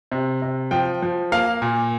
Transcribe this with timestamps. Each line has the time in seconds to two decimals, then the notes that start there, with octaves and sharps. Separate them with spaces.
0.12 C3
0.42 C3
0.71 F3 G5
1.02 F3
1.32 A#3 F5
1.62 A#2